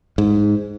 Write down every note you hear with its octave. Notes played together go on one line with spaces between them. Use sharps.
G#2